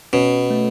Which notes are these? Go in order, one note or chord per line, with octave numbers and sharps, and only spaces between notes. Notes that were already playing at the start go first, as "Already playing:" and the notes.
B2 C#4
A3